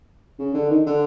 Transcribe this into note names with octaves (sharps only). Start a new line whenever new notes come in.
C#3
D3
D#3
D3